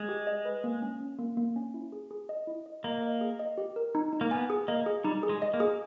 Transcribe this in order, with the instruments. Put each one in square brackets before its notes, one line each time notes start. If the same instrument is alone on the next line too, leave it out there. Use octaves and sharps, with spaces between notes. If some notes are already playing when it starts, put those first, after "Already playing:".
Already playing: [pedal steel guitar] G#3
[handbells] G4
D#5
B4
A#3
C#4
C#4
A#3
A#3
C#4
E4
G#4
G#4
D#5
E4
D#5
[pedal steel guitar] A#3 [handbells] D#5
[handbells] D#5
G#4
D#5
G4
A#4
D#4
D#4
[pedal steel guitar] A#3
[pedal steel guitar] B3 [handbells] G#5
[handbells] G#4
[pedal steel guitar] A#3 [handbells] D#5
[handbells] G#4
[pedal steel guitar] G3 [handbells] D#4
[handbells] G#4
[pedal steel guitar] G#3
[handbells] D#5
[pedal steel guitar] A#3
[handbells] G#4